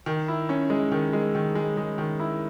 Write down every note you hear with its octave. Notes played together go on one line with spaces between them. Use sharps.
D#3
E4
C#4
G#3
D#3
G#3
D#3
G#3
G#3
D#3
E4